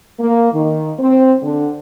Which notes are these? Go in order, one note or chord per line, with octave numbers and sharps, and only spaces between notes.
A#3
D#3
C4
D3